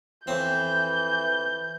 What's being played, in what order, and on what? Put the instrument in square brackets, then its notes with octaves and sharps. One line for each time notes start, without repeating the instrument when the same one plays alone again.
[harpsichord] F2 C4 [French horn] E3 [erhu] G6